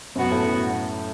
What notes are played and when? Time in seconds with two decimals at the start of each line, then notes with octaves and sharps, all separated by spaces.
0.16 F#2 B2 B3 F#4
0.31 A2